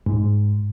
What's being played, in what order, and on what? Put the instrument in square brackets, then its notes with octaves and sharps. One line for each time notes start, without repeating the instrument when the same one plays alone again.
[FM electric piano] G#2